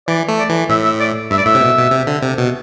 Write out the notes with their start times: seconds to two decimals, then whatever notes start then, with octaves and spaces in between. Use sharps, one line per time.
0.08 E3 D5
0.28 A3
0.39 D5
0.49 E3
0.69 A2 E5
0.84 E5
1.00 D5
1.31 G2 E5
1.38 D5
1.45 A2 E5
1.55 C3
1.61 B2
1.77 B2
1.91 C3
2.07 D3
2.22 C3
2.38 B2